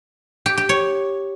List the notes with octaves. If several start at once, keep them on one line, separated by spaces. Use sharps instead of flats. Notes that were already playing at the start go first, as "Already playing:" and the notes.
G4
G4
C#5